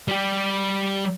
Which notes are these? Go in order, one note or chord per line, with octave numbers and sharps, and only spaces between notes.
G3 G4